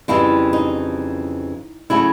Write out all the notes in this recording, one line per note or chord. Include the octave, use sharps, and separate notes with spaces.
F2 C#3 E3 G3 E4
D#4
C#3 F#3 A3 E4